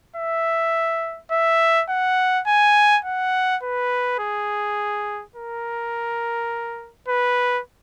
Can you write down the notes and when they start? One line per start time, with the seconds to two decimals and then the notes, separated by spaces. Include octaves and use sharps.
0.16 E5
1.32 E5
1.89 F#5
2.47 G#5
3.05 F#5
3.63 B4
4.19 G#4
5.36 A#4
7.09 B4